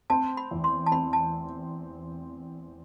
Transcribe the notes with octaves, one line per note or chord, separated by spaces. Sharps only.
C4 A5
B5
E2
C6
A5
C4 B5
A5